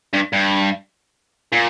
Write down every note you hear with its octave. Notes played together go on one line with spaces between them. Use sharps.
G2
G2
A#2